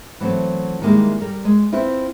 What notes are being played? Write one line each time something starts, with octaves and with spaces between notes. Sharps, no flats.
E3 F#3 A3 C4
D#3 G3 G#3 A#3 E4
G3 A#4
G#3
C4 E4 F4 B4